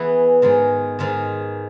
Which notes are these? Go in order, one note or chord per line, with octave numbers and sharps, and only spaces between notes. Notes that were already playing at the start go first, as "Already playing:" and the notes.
Already playing: E3 B3 E4 G#4
G#2 D#3 G#3
G#2 D#3 G#3